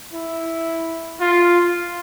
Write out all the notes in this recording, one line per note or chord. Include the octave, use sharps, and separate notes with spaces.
E4
F4